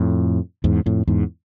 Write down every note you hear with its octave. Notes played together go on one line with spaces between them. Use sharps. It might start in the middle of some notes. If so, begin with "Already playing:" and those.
Already playing: F2 A2
E2 G#2
F2 A2
E2 G#2